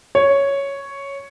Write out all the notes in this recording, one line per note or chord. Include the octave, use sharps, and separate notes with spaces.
C#5